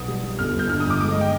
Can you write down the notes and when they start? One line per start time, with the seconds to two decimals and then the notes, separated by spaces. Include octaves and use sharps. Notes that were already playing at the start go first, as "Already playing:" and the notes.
Already playing: B1 B3 D#6
0.08 G3
0.23 G3
0.39 G1 F6
0.54 G1 G6
0.69 D3 F6
0.80 D#6
0.85 G1
0.90 D6
1.00 G#3 D6
1.11 D#5
1.16 G#3
1.21 G5